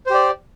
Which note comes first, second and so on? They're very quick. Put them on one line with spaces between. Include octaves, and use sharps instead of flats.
C5 G4 D5